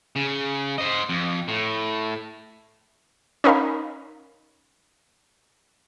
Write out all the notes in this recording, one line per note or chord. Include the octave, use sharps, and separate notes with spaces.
C#3
C5 D#5
F2
A2
C#4 D#4 A#4 F5 B5